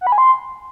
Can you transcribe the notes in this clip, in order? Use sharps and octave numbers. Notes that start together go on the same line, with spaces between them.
F#5
B5
G#5
C6